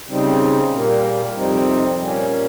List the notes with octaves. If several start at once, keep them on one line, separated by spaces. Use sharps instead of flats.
C#3 G3 C4 D#4
A#2 G3 A#3
F2 C3 G3 C4 D#4
A#2 G3 A#3 C#4